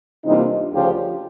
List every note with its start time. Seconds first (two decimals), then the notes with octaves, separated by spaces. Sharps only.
0.25 C3 E3 G3 A#3 D4 D#4 F4
0.72 D2 C#3 F3 F4 G4